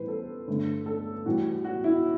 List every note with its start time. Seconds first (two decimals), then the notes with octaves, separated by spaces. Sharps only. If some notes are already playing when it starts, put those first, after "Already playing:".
Already playing: A2 E3 G3 B4 C5
0.08 A4
0.48 G2 D3 A3
0.86 A4
1.25 A2 E3 G3 F#4
1.64 F#4
1.84 E4